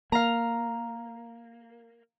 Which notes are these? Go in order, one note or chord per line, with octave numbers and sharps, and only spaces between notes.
A#3 F5 A#5